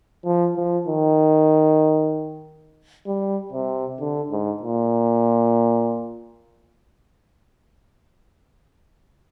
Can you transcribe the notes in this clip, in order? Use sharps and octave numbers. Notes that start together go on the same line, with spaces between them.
F3
F3
D#3
G3
C3
D3
G#2
A#2